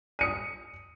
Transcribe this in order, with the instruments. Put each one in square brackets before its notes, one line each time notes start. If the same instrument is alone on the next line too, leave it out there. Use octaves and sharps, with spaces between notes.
[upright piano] D#6 C#7 D#7